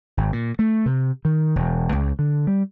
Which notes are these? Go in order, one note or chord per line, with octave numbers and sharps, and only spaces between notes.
G#1
A#2
A3
C3
D#3
E1
C#2
D3
G3